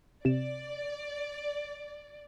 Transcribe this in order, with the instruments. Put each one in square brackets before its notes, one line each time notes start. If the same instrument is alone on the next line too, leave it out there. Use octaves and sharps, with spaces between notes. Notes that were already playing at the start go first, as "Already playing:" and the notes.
[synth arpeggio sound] C3 E7 [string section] D5